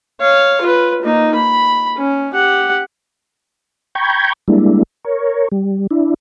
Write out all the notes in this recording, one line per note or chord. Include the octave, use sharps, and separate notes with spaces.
C#5 F5
F4 B4
A#3 D#4
B5
C#4
G4 F#5
G5 A#5 B5 C#6 G6 G#6
G3 G#3 A#3 D4 E4
A#4 C#5
G3
D4 E4